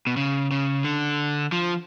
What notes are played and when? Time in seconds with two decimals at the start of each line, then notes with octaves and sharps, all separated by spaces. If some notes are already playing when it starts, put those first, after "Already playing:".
0.07 B2
0.17 C#3
0.51 C#3
0.84 D3
1.52 F3